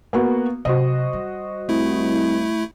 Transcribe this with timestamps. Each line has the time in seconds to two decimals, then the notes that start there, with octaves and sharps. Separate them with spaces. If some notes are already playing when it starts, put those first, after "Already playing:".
0.13 A#3 B3 F#4
0.65 C3 F#3 F#4 C5 D#5
1.13 G3
1.69 C2 A3 E4